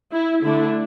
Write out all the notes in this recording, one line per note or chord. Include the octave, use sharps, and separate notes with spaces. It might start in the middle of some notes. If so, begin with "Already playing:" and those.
E4
D3 A3 D4 E4